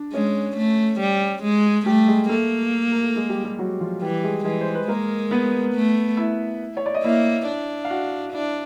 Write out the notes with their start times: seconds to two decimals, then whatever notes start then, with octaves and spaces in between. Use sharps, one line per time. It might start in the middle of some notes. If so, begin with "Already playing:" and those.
Already playing: D4
0.13 G#3 C#4
0.57 A3
1.00 G3
1.43 G#3
1.86 G3 A3 G4
2.07 G#3 G#4
2.29 A3 A#3 A4
2.91 A#4
3.03 A4
3.16 G#3 G#4
3.29 G3 G4
3.44 G3 G4
3.59 F#3 F#4
3.80 F3 F4
4.02 E3 G3 G4
4.23 G#3 G#4
4.45 E3 G#3 G#4
4.61 C5
4.75 B4
4.88 G#3 A#3 A#4
5.31 B3 B4
5.75 A3
6.17 E4 E5
6.77 C#5
6.86 D5
6.94 D#5
7.03 A#3 E4 E5
7.47 D4
7.85 F5
7.90 F#4 F#5
8.33 D4 E4 E5